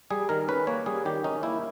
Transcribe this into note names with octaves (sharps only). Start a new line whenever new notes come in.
G3 G#4
D#3 A#4
C#4 B4
A#3 C#5
G3 G#4
D#3 G4
C#4 D#4
A#3 E4